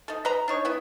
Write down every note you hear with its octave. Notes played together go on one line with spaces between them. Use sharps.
D#4 A4
B4 D#5 A#5
D4 D#4 C#5
B3 E4